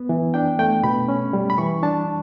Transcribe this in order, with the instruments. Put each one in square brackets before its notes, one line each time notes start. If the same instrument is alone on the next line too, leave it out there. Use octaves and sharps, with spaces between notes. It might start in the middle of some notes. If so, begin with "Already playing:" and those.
Already playing: [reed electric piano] B3
E3
D4 G5
A3 G5
B2 B5
C#4
G3
B5
E3 C#6
D4 A5